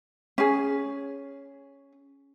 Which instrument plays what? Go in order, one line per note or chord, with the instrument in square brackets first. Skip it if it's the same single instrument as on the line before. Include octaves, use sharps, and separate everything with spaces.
[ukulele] C#4 G#4